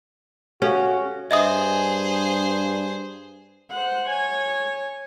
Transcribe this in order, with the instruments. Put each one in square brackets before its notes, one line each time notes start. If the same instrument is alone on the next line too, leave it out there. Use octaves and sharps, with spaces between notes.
[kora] C#4 [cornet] F#4 [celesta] G4 A4 F5
[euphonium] G2 [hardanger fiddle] G#4 C5 [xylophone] D#5 E5 D#6
[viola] C5 F#5
C#5 G#5